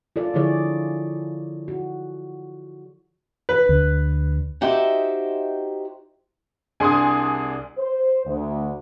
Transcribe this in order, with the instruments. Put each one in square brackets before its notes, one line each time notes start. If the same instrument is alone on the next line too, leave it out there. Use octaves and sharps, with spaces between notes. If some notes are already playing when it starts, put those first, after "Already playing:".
[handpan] F4 A4 D5
D3 F3 E4 G#4 C#5 D5
F#4
[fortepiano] B4
[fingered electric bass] D2
[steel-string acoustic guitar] D#4 F#4 G4 C5 D#5 E5
[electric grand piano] C2 D4 G#4 [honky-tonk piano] G#5 C6 D#6
[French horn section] C5
D2